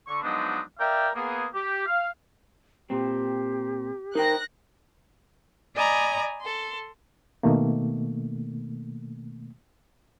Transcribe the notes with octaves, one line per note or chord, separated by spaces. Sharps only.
D3 C#6
F3 F#3 G#3 B3 D4 D#4
A#4 D5 E5 F5 G5
A#3 B3 G#4
G4
F5
A#2 C4 G4
D#4 A#4 C5 G5 F#6 A#6
D5 D#5 G#5 A#5 B5
A4 C6
B2 D#3 A3 A#3